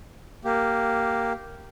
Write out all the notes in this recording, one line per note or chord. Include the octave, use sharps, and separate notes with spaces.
A#3 G4